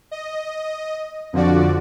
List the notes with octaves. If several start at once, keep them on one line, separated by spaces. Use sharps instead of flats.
D#5
F2 D3 F3 F#4 D5